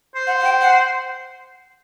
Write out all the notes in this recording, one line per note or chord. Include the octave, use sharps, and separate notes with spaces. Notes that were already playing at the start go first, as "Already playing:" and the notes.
C5
F#5
F#5
G5
F#5